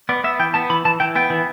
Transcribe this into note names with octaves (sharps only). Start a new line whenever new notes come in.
B3 D5
B3 E5
E3 G5
B3 A5
E3 B5
E3 A5
E3 G5
B3 G5
E3